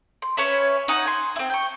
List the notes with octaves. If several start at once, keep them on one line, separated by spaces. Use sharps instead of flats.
C6
C#4 B4 C#5 E5
D#4 F#4 F#5 G#5
G#5 C6
C4 E4
G5 C#6